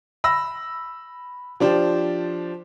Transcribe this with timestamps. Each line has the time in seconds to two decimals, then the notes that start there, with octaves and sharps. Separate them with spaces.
0.24 B5 E6 A#6
1.60 F3 D4 G4 C5